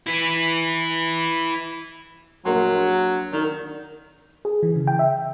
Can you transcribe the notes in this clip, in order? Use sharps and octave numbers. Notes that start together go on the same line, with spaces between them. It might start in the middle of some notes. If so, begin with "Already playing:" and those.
E4 B4
A#1 F#3 A#4 C6
D#3 D4 A#4
G#4
E3
C#3
G5
E5